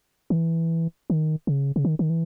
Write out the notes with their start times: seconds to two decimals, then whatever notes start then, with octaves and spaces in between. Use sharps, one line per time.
0.30 D#3
0.35 E3
1.10 D#3
1.47 C#3
1.76 C#3
1.85 D#3
1.99 D#3
2.10 E3